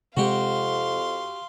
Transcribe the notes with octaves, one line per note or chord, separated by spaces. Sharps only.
F2 C3 G#3 F#4 G4 F5 C6